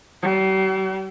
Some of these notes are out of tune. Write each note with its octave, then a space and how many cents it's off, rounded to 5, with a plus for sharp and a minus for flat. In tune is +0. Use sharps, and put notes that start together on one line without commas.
G3 -45